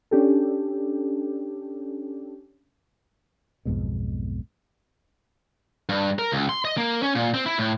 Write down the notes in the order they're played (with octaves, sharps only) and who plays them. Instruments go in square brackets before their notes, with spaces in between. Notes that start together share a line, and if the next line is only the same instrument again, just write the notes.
[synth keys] C#4 D4 G4 A4
[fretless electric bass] B1 F2 G#2 B2
[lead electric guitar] G2
A#4
C#2
C6
D#5
A#3
C#4
A#2
C4
E4
A2